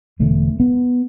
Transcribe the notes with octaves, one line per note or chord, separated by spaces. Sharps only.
E1 E2 D3 A3
B3